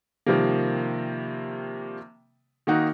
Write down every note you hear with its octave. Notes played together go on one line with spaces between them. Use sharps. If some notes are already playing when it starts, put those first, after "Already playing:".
C3 D#3 F3 G3 A#3
D#3 A#3 D#4 F#4